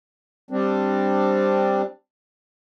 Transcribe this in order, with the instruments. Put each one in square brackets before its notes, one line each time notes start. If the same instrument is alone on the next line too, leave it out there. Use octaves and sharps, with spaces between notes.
[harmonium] G3 C4 D4